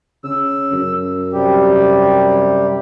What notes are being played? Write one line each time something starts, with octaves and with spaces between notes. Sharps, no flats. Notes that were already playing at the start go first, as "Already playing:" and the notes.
C#3 E6
F#2
C3 G3 G4